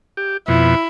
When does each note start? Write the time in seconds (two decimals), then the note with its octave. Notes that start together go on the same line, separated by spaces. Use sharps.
0.17 G4
0.48 F2 B2 E4